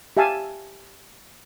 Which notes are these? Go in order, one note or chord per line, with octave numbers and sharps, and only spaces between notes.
G4 E5 F5 G#5 A5